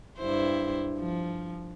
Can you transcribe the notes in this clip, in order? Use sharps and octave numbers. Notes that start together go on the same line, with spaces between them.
G2 E4 C5
F3